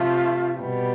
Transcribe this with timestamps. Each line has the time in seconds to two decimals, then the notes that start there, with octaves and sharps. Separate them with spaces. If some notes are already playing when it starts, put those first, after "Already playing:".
Already playing: C3 F3 A3 F4
0.59 B2 G3 B3